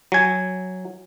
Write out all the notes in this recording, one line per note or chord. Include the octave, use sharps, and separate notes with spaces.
F#3 G#5